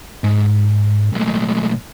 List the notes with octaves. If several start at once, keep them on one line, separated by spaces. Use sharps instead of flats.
G#2
B1 A2